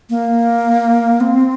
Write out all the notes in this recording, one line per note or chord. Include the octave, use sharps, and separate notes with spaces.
A#3
C4